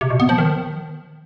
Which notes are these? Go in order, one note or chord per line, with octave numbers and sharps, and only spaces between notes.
C3
B2
B3
F3
D#3